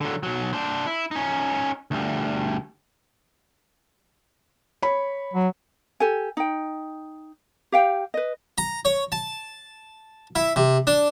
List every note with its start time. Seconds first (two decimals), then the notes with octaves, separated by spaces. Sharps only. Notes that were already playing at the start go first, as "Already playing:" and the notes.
0.01 D3 F#3
0.23 B1 F#3
0.53 D4 C5
0.86 E4
1.11 C#4 D#4
1.91 D2 G3
4.82 C#5 B5
5.34 F#3
6.00 G4 A4 G#5
6.37 D#4 G5
7.72 G4 F5 G5
8.14 B4 D#5
8.58 A#5
8.85 C#5
9.12 A5
10.35 E4
10.56 C3
10.87 D4